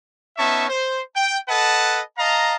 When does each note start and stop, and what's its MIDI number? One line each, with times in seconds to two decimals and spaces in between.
0.38 0.69 59
0.38 0.69 61
0.38 0.69 63
0.38 0.69 76
0.38 0.69 81
0.38 0.69 85
0.69 1.01 72
1.15 1.38 79
1.49 2.01 69
1.49 2.01 71
1.49 2.01 75
1.49 2.01 78
1.49 2.01 81
2.18 2.56 75
2.18 2.56 77
2.18 2.56 81
2.18 2.56 82